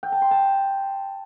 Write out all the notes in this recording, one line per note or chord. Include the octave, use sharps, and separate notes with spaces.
G5
A5
C6
A5